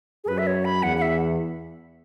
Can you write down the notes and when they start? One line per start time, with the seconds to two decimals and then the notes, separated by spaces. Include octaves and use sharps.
0.24 G#4
0.28 F#2 B4
0.38 E5
0.47 C#5
0.65 B5
0.83 E2 F#5
0.97 F#5
1.02 E5